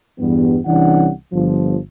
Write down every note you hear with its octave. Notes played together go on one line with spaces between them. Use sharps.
E2 G2 G3 B3
C2 E3 C#4 D4 F#5
G1 F3